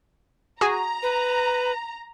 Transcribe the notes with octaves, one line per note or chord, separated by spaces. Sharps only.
F#4 G#4 G#5 A#5
B4